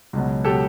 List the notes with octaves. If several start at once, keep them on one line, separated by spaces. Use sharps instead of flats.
C#2 B2 F#3
B2 F#3 G4 A4